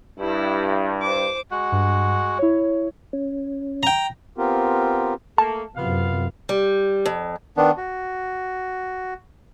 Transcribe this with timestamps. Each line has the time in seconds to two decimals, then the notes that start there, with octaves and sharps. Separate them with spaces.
0.19 G2 E4
1.02 C5 D6
1.51 G#3 F#4 F#5
1.72 G2
2.39 E4 C#5
3.13 C#4
3.83 G5 A#5
4.38 B3 C4 F4 G4 A#4
5.38 A3 A#3 A5
5.77 F#2 C3 B3 F4 F5
6.49 G3
7.06 F2
7.57 D#3 B3 D4
7.77 F#4